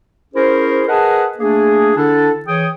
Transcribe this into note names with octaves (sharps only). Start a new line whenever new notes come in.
C#4 E4 G#4 A#4 C5
G#4 A#4 B4 D#5 F#5 A5
A3 A#3 D4 G#4
D3 D4 E4 A4
E3 G#4 C#5 G5 D#6